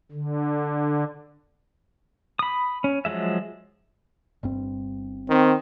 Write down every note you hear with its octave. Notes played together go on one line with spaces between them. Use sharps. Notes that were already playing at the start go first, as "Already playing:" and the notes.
D3
B5 D#6
C#4
F3 F#3 G#3 E5
G1 G2 C4
D#3 C4